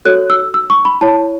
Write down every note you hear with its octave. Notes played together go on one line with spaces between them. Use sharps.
F#4 A4 C#5 F#6
E6
E6
C#6
B5
E4 C#5 A5